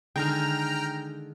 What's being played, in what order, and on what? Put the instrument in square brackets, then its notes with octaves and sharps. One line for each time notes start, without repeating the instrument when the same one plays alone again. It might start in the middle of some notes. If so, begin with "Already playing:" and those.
[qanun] D3 D#3 G#3 [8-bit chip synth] G5 A#5 F6